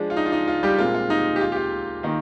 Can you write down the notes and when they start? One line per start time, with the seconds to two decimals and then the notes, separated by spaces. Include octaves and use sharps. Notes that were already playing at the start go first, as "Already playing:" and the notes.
Already playing: F3 G#3 D4 G#4
0.10 F4
0.17 D#4
0.26 F4
0.32 D#4
0.48 F4
0.63 G3 G4
0.78 A#2 G#3 C4 F4 G4 A#4
0.94 F4
1.10 D#4
1.36 G4
1.41 F4
1.52 G4
1.56 F4
2.03 D#3 A#3 D#4